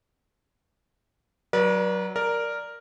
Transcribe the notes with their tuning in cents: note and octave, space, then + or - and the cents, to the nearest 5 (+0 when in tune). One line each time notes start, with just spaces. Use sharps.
F#3 +15 B4 -40 D5 +0
A#4 +0 D5 +0